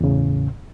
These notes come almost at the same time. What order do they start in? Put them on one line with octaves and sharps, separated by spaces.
E2 C#3 A2